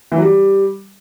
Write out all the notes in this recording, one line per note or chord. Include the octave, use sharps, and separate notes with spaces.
E3
F#3
G3